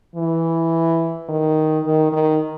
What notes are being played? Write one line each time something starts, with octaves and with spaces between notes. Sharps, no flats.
E3
D#3
D#3
D#3